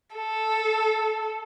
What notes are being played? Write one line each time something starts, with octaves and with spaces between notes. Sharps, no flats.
A4